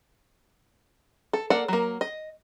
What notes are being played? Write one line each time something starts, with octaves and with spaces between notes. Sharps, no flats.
A4
A#3 A4 D5 F#5
F#3 A#3
D#5